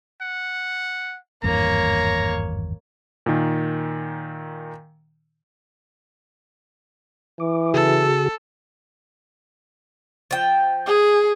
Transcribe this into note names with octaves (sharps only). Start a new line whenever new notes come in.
F#5
G#1 E2 G2 A#3 C#5 A#5
A#2 D#3
E3 D6
C#3 F#4 G#4 A4
F3 G5
G#4